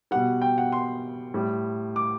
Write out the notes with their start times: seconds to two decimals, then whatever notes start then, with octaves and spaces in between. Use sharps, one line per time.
0.11 B2 G3 F#5
0.42 G5
0.58 F#5
0.72 C6
1.34 A2 G3
1.96 D6